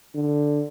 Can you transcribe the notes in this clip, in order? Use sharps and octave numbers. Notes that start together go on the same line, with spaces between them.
D3